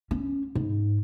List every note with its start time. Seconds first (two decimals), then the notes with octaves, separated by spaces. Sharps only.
0.11 C#4
0.55 G#2